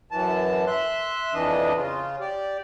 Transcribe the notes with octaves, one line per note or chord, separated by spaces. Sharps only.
F#2 E3 A5
E5 C6 F#6
F2 E3 D4 D#5
C#3 F4
G4 D5